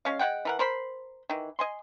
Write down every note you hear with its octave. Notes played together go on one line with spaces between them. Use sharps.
G#3 C#4 F5
G#3 C4 F#5 G5
E3 A#4 F#5
A#4 C5 B5 C6
D#3 E3
D#5 G#5 C6